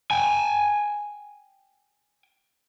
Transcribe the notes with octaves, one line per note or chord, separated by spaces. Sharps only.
G5 G#5